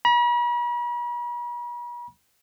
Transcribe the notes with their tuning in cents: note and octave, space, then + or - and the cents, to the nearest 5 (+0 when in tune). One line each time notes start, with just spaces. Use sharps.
B5 -45